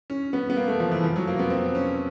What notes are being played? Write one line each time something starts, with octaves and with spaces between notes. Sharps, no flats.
C#4
B3
B3
A#3
A3
F3
E3
F3
F#3
A#3
B3
C4
C#4